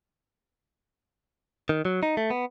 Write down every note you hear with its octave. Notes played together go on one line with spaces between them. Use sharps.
D#3
F#3
D#4
A3
B3